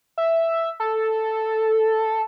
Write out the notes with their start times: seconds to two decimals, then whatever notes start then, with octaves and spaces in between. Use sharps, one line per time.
0.18 E5
0.80 A4